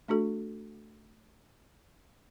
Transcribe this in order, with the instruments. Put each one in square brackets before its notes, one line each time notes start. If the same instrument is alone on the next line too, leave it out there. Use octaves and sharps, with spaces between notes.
[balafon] A3 D4 F#4 A4